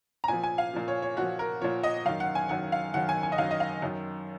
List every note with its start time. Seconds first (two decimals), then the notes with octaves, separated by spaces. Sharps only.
0.24 A#5
0.28 A#2 F3 G#5
0.44 G#5
0.58 F5
0.73 A#2 F3
0.88 C#5
1.02 C#5
1.17 A#2 F3 F#4
1.39 A#4
1.61 A#2 F3 C#5
1.83 D#5
2.06 F#2 D#3 F5
2.20 F#5
2.35 G#5
2.49 F#2 D#3 F#5
2.72 F5
2.94 F#2 D#3 F#5
3.09 G#5
3.23 G#5
3.32 D#5
3.38 F#2 D#3 F5
3.51 D#5
3.60 F5
3.82 F#2 D#3